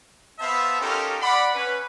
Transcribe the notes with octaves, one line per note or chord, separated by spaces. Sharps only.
B3 C5 E5 F5 A5
C#4 D#4 F4 G4 A4 A#4
D5 F#5 B5
C#4 B4